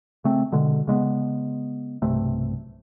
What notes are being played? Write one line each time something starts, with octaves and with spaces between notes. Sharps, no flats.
C#3 A3 C4
B2 D3 G#3
C#3 G#3 A#3 B3
B1 G2 C3 A3